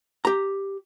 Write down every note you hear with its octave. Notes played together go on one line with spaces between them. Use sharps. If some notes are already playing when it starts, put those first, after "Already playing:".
G4 A#5